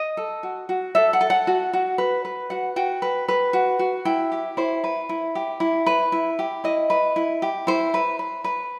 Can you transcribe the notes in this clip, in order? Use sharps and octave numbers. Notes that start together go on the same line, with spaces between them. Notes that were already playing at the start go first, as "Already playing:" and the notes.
Already playing: D#5
A4
F#4
F#4
A4 E5
F#5
A4
F#5
F#4
F#4
B4
B4
F#4 F#5
F#4 G5
B4
B4
F#4
F#4
E4 G5
G4
E4 C5
B4
E4
G4
E4
B4
E4
G4
E4 D#5
B4
E4
G4
E4 C5
B4
B4
B4